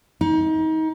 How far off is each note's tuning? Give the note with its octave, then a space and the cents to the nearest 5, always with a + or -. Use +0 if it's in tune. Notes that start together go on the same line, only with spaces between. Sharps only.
D#4 +30